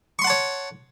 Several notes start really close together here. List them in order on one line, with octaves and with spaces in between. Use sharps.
C#6 C6 F#5 A5 C#5